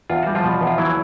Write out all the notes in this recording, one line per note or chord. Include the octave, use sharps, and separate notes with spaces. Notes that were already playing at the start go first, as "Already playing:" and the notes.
E2 F4
G3 F#4
F3 F4
B2
E2
F4
E3 F#3 E4